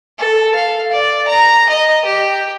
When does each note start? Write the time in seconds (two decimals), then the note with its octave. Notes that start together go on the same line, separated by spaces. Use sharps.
0.18 A4
0.55 F5
0.92 D5
1.28 A#5
1.69 D#5
2.05 G4